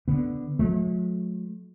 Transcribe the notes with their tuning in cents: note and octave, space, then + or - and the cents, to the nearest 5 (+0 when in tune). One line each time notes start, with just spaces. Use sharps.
D3 +0 B3 +0
F#3 -45 A3 -40